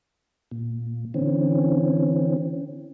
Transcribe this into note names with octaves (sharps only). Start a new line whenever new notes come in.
A#2
D3 E3 C4 C#4